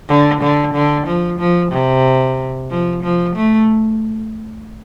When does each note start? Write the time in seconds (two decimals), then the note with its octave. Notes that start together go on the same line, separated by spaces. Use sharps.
0.08 D3
0.41 D3
0.74 D3
1.07 F3
1.39 F3
1.72 C3
2.70 F3
3.03 F3
3.35 A3